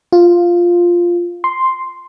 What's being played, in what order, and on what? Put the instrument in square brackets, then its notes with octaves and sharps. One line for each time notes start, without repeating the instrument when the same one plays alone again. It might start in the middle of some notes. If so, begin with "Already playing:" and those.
[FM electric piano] F4
C6